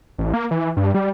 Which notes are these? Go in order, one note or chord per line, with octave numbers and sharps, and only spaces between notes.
A1
A#3
E3
G2
G3